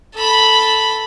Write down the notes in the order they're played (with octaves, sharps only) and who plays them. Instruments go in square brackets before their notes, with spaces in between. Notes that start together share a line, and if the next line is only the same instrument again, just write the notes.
[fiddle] A4 B5